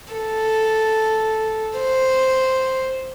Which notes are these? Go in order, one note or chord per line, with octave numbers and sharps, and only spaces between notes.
A4
C5